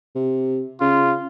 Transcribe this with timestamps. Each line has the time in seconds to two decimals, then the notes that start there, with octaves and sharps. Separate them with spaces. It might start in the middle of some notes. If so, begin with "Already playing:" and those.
0.15 C3
0.81 C#3 F4